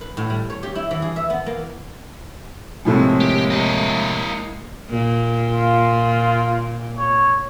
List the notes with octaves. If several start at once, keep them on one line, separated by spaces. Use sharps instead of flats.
B4
A2
G3
C#5
G4
E4
E3
G#4
E5
B3
A#3
F2 A2 C3 G#3 A#3
G4
E4 D#5
A#2
F4
C#5